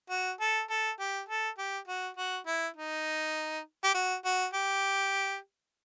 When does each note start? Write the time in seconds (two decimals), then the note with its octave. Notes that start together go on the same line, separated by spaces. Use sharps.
0.10 F#4
0.41 A4
0.70 A4
1.00 G4
1.29 A4
1.58 G4
1.88 F#4
2.17 F#4
2.46 E4
2.76 D#4
3.84 G4
3.94 F#4
4.25 F#4
4.53 G4